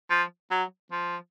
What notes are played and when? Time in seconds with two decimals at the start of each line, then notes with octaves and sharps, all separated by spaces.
0.10 F3
0.51 F#3
0.92 F3